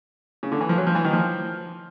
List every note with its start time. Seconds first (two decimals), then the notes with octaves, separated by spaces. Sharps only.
0.43 C#3
0.52 D3
0.61 E3
0.69 F3
0.78 F#3
0.87 F3
0.95 E3
1.05 D#3
1.13 F3